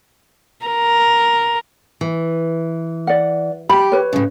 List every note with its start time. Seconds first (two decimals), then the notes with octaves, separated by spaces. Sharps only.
0.66 A#4
2.01 E3
3.07 D5 F#5
3.69 G4 B5
3.92 B4 C#5
4.13 A2 C#3